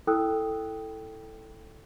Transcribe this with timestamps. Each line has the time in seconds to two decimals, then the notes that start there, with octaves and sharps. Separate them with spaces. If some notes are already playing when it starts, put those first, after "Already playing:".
0.07 E4 A4 G5 D#6 E6 F#6